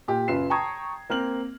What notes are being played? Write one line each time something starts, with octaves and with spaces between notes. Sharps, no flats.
A#2 G4
F#2 C#3 F4 B4 C7 E7
G5 A5 A#5 C#6 D#6 G#6
A#3 C4 F6 F#7